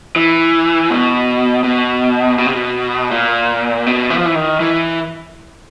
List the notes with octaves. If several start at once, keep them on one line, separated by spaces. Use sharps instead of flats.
E3
B2
B2
B2
C3
B2
A#2
B2
E3
F3
E3
D#3
E3